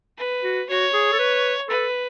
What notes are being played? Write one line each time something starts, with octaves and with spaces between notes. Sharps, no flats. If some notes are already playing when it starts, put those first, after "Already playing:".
B4
F#4
F#4 C#5
G#4
A4
B4
A4 B4